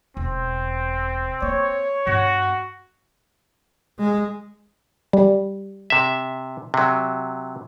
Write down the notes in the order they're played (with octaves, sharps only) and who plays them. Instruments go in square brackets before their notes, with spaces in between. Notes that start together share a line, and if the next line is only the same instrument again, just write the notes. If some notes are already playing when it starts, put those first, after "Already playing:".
[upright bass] E1 E2 [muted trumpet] C4
[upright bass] A#3 [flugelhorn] C#5
[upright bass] G2 B3 [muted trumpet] F#4
[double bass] G#3
[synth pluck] G3
[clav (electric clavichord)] C3 E5
C3 F#3